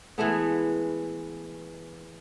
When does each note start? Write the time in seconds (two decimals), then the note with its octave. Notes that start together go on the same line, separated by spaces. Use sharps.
0.18 E3 G#3 A3 B3